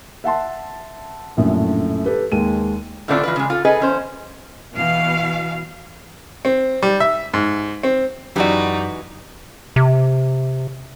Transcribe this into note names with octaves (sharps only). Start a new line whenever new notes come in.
E5 F#5 A5 C6
A#1 F#2 A2 D3
G4 A4 B4
D#2 G#3 D#7
A2 D3 A3 C4 D4 F4
E3 F4 B4
C#3 G#3
F4 A4
G#4 A4 B4 D#5
E2 C#4 C5
B2 E3 F5
C4
G3
E5
G#2
C4
F#2 E3 G#3 D#4 F#4 G4 D5
C3